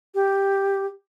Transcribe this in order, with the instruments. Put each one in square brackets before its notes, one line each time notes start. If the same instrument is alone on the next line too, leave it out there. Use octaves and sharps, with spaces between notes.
[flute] G4